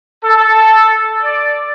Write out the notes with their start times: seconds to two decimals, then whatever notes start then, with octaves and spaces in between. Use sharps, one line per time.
0.24 A4
1.23 D5